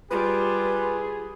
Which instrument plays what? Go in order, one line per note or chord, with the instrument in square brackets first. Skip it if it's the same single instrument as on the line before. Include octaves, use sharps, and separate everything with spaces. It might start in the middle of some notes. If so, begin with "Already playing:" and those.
[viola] G3 [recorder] F4 [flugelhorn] G#4 [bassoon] B4